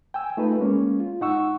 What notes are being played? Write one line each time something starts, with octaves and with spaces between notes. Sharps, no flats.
G5 G#5 E6
A3 D#4 F4 B4
G#3 A#3 C#4
F4
G#2 D#4 F#5 C#6 E6